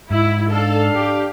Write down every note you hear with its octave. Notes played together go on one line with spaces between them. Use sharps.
G#2 E4
D4 A4 F5
G4